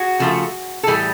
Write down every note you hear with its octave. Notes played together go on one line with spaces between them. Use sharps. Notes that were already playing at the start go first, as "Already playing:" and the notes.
Already playing: F#4 G#4
C#3 F3 A3
A4
A2 E3 G3 G#4